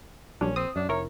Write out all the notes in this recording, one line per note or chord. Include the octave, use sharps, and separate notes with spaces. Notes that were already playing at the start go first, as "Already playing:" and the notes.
A#1 F#3 G3 C#4 D4
C4 D#6
F#2 D4
F1 E4 A#4 C#5